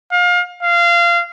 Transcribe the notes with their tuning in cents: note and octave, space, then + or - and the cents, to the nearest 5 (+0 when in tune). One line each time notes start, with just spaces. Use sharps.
F5 +30
F5 -20